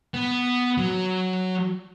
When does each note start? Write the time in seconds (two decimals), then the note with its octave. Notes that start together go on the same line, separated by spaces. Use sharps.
0.14 B3
0.78 F#3